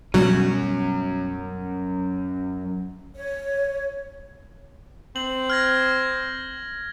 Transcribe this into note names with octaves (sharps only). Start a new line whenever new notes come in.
F#2 B2 F#3 G3 C#4
C#5
C4 F#7
F6 G#6 A#6